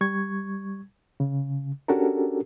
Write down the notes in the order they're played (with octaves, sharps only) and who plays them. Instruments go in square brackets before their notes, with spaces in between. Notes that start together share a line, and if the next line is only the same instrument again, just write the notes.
[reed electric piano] G3 C#6 G#6
C#3
C#4 D4 F#4 G4 A4 A#4